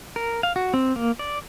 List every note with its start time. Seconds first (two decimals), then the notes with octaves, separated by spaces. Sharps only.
0.16 A#4
0.43 F5
0.56 F#4
0.74 C4
0.96 A#3
1.19 D5